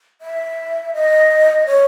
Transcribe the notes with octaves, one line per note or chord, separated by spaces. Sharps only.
E5
D#5
C#5